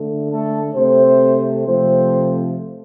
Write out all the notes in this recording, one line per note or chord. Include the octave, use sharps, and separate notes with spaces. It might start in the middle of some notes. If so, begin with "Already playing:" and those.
Already playing: D3 A3
A3 A4
C3 A3 C4 C5
C3 F3 A3 C4 C5